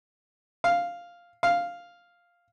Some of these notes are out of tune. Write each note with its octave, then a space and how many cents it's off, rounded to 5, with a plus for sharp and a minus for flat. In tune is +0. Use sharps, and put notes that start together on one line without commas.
F5 +0
F5 +0